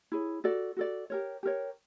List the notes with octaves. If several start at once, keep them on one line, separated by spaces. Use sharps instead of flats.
E4 G#4 C#5
F#4 A4 D5
F#4 A4 D5
G4 A#4 C#5
G4 A#4 C#5